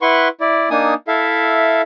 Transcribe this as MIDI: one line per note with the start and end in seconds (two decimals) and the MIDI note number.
0.02 0.28 64
0.02 0.28 71
0.02 0.28 78
0.02 0.28 84
0.02 0.28 85
0.40 0.69 64
0.40 0.69 74
0.70 0.94 58
0.70 0.94 62
0.70 0.94 63
0.70 0.94 80
0.70 0.94 87
1.08 1.82 64
1.08 1.82 69
1.08 1.82 76
1.08 1.82 77